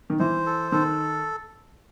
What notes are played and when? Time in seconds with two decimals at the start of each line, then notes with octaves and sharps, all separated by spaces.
0.10 D#3
0.19 E3 C5
0.46 A4
0.72 D#3 A4